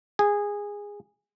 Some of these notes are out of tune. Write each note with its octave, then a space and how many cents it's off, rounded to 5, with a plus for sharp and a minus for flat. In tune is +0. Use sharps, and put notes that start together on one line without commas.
G#4 -15